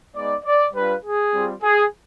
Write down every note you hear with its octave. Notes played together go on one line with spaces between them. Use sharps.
G#3 B3 D#4 D5
D5
G3 D4 F4 B4
G#4
G3 C4 F4
G#4